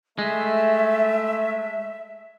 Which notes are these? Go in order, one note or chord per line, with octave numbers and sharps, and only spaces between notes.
G#3 A3 E5